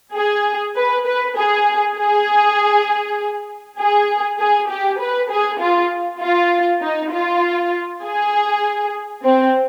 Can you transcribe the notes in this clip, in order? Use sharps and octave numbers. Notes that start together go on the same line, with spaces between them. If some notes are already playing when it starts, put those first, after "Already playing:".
G#4
B4
B4
G#4
G#4
G#4
G#4
G4
B4
G#4
F4
F4
D#4
F4
G#4
C4